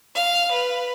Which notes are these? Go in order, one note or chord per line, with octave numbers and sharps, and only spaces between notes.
F5
B4